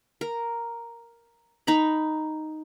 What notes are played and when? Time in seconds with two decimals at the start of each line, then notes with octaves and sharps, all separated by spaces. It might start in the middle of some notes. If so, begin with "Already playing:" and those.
0.21 A#4
1.67 D#4 A#5 B5